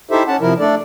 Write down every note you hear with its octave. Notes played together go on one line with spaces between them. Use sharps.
D#4 E4 G4 A4 C5 E5
C#4 F#5 A5
C3 F3 E4 A#4
A3 D4 A4 D5